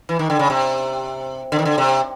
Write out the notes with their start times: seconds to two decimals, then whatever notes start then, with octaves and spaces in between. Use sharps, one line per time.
0.09 E3
0.19 D#3
0.30 D3
0.39 C#3
0.50 C3
1.52 D3
1.59 D#3
1.65 D3
1.78 C3